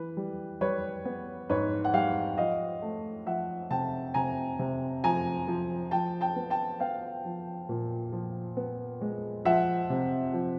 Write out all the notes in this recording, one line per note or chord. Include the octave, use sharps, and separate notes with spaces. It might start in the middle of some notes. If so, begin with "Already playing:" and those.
Already playing: E3 B4
G3
G3 B4 C#5
B3
G#2 B4 C#5
F#5
G3 F5 G5
F3 D#5 F5
A3
F3 E5 F#5
C3 G5 A5
C3 G#5 A#5
C3
F3 G#5 A#5
F3
F3 G5 A5
G5 A5
B3
G5 A5
B3 F5 G5
F3
A#2
F3
B3
G#3
F3 E5 F#5
C3
F3